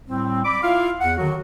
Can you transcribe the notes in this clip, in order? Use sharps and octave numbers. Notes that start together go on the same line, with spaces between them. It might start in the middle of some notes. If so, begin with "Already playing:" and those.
A2 G3 C4
D5 B5 D6
E4 F4 F5
E2 F#5
D3 D#3 F#3 F#4